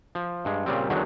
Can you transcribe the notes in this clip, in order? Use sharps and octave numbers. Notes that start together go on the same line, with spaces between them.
F3
G2 G#3
A#2 C#3 G3 C4
E2 D3 D#3 F#3 G#3